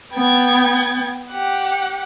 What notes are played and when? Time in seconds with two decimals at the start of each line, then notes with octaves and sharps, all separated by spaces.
0.13 B3 G5 G#6 A6
1.30 G4 F#5